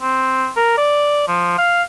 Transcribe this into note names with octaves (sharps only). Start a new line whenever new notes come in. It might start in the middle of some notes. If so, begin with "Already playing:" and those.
C4
A#4
D5
F3
F5